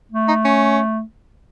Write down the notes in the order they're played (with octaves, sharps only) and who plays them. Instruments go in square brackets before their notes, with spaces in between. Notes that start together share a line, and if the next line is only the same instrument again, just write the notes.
[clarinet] A3
[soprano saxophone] D#4
C#4